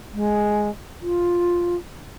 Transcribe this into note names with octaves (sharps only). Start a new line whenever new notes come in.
G#3
F4